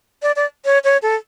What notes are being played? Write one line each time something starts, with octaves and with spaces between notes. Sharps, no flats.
D5
D5
C#5
C#5
A4